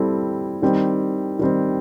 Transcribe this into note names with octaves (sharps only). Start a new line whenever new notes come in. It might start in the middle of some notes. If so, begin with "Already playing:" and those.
Already playing: G3 C4 E4 A4
D#3 G3 C4
D#3 G3 C4